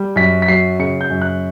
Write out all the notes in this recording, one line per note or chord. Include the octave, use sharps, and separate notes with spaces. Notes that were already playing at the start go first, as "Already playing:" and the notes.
Already playing: G3
F#2 B6
B6
F#3 C7
C#3 C#7
G6
F#2
F#6